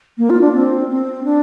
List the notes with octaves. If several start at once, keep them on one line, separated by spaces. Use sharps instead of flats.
A#3
F4
D4
C4
C4
D4